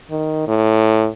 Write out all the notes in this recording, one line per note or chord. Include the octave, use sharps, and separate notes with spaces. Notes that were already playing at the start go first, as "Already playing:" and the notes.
D#3
A2